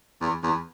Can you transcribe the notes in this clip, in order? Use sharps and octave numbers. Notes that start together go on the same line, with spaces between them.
E2
E2